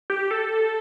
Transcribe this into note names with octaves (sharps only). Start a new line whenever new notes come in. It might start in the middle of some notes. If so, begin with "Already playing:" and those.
G4
A4